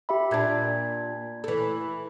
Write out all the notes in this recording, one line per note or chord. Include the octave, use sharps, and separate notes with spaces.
G4 E5 B5
A#2 D4 B5 G#6
E3 A3